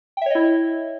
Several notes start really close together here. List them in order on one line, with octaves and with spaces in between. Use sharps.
G5 E5 C#5 D#5 E4